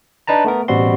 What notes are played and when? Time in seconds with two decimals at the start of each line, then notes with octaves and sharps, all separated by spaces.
0.27 D4 D#4 B4 A5 A#5
0.44 A3 B3 A#4
0.68 A1 B2 G3 C4 F#4 C6